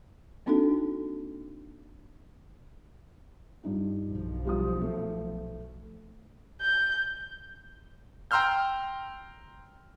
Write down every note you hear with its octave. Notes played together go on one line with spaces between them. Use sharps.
A#3 C4 D4 D#4 F#4 A4
G2 D#4 F4
B1 F3
G3 F4 D#6
A3
G6
G5 A#5 C6 E6 F6 G6